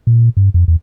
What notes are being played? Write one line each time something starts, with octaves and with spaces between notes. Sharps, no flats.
A#2
G2
F2
E2